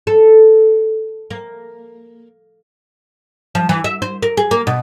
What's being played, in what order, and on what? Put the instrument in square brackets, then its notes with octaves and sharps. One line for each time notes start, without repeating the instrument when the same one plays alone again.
[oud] A4
A#3
F3
E3
E5
C5
A#4
G#4
A#3
B2